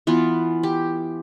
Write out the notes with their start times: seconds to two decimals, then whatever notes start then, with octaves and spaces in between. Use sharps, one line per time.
0.07 E3 B3 F4
0.63 G4